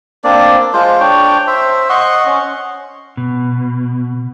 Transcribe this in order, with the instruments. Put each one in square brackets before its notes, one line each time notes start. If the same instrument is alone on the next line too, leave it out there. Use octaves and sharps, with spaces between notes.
[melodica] A#3 C4 D4 D5
G#3 F4 C5
D4 C#5 G5
C5 E5
D#5 F#5 C6 C#6
C#4
[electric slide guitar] B2